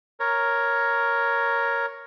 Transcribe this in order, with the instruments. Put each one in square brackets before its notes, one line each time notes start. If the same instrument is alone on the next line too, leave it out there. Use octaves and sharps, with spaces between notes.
[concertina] A#4 C#5